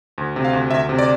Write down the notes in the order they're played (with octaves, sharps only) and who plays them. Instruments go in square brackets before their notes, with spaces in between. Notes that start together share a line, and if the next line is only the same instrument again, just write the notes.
[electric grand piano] D2
C3
F5
D2
D2 E5
C3
D5